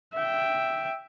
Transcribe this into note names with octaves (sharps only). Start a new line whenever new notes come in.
E5 G5